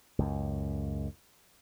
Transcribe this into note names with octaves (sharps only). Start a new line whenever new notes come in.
C#2 F#2